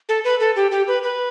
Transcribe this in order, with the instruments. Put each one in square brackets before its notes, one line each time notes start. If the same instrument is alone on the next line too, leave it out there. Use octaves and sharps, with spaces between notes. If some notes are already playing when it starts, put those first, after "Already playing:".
[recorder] A4
B4
A4
G4
G4
B4
B4